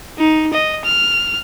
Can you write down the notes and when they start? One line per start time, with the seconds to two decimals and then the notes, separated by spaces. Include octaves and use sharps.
0.18 D#4
0.53 D#5
0.85 F6